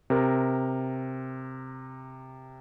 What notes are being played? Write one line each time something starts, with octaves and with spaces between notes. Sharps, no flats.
C3 A#4